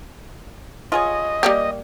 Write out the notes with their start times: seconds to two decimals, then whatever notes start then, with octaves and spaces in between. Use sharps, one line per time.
0.92 F4 G#4 C#5 D#5
1.43 G3 A#3 G4